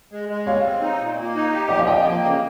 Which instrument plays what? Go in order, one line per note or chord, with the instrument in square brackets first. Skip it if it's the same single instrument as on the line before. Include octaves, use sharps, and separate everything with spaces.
[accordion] G#3
G#3
[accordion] G3 [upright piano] C#5 F5
[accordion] C4
D#4
A#2
A#3
D#4
G4
[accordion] F3 [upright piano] D#5
[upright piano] F5
[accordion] F3 [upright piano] D#5 G5
[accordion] A#3
C#3